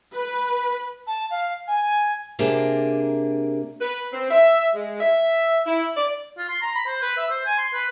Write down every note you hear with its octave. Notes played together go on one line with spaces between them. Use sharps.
B4
A5
F5
G#5
C3 A#3 D4 G4 G#4
B4
C4
E5
G#3
E5
E4
D5
F4
C6
A#5
B5
C5
B4
E5
C5
G#5
C6
B4